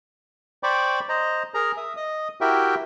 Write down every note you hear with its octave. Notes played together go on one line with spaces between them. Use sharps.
C5 D5 G5 B5 C#6 D6
C5 D#5 A#5
G#4 A#4 A#5
E5 D#6
D#5 D#6
E4 F#4 G4 A#4 E5 G5